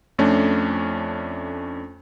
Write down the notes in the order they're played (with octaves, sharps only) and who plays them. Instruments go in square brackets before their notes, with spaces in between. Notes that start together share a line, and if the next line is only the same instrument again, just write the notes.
[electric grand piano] F2 A3 C#4 D4